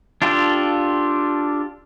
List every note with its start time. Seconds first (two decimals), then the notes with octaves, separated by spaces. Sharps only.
0.22 D4 F4 G4 A4